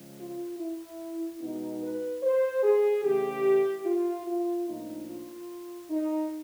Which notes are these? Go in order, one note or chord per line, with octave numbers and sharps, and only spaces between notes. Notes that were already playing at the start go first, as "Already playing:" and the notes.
Already playing: C#3 F3 G#3
F4
E4
B2 G#3 B3 D#4
B4
C5
G#4
C#3 E3 A3 C#4 G4
F4
F4
A2 F3 A#3 D4 D#4
F4
D#4